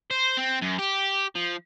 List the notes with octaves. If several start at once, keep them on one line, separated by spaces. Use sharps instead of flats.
C5
C4
F#2
G4
F3